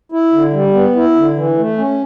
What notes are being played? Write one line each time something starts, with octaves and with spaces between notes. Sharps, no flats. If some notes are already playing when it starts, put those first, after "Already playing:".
E4
D3
G3
B3
E4
D3
E3
A3
C#4